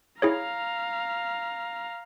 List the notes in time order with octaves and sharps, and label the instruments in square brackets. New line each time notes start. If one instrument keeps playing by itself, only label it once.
[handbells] E4 G#4 C#5 [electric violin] F5 A#5